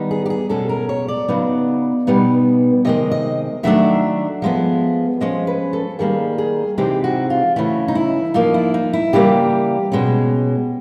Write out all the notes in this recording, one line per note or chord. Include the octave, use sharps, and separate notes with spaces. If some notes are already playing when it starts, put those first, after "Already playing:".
Already playing: D#3 G3 B3 D#4
G#4
G4
G#4
B2 G#3 C#4 A4
A#4
C#5
D5
C#3 F#3 B3 D#4
B2 G3 B3 D#4
C3 D#3 G#3 D#5
D#5
D#3 F#3 A3 D4 E5
F3 G#3 B3
F3 G#3 C#4 D#5
B4
A4
D#3 G3 A#3 G#4
G#4
C3 E3 G#3 C4 D#4 G4
F#4
F4
C#3 E3 A3 C#4 E4
D#4
E4
F3 A#3 D#4 F4
E4
D#4
E4
C#3 E3 G3 A#3 G4
B2 G#3 C#4